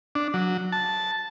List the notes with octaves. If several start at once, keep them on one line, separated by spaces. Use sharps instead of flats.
D4
F#3
A5